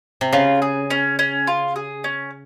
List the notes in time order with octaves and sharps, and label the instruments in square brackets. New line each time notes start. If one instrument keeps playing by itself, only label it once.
[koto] C3
[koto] C#3 [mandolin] F4
[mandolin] G#4
C#4
C#4
F4
G#4
C#4